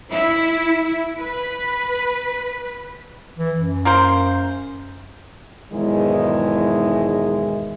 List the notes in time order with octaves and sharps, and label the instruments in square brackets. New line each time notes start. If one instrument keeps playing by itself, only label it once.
[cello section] E4
B4
[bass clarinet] E3
F#2
[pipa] A#3 A#4 C5
[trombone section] B1 E2 G#2 D#3 G#3 E4